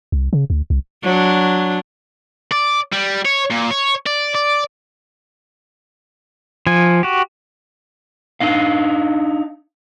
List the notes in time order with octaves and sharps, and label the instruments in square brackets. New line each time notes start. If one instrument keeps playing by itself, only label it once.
[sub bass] C2
C#3
D2
C2
[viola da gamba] F#3 D4
[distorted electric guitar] D5
G3
C#5
A#2
C#5
D5
D5
[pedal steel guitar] F3 G#5
F#4 G4
[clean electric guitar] D4 D#4 F5